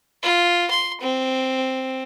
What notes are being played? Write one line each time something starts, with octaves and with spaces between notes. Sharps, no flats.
F4
C6
C4